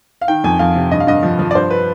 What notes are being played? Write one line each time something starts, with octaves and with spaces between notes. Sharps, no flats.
F5
D#3 G5
F2 G#5
F2 F5
C3
G2 D#5
F5
G2 D#5
F3
F3
D5
G2 C5
B4